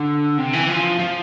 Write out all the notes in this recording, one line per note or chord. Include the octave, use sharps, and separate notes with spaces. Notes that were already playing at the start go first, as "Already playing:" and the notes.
Already playing: D3
C3
E3
F3
F3